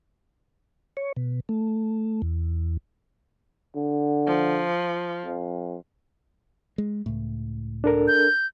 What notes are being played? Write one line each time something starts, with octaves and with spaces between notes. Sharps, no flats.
C#5
B2
A3
E2
D3
F3
F2
G#3
C#2 A2
D4 A4 A#4
G6